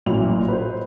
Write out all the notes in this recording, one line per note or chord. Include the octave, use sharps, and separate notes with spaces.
A1 A#2 F#3 E4 F7
B4 C5